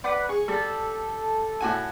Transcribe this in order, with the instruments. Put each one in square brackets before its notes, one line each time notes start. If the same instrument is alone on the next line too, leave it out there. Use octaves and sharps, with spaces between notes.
[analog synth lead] B4 [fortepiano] D5 F#5 D6
[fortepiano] G#4 [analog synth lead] C#6
[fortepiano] G3 [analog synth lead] A4
[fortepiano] A2 F#4 G#5